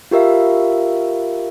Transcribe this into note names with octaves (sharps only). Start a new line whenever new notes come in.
F4 G4 A#4 E5 F5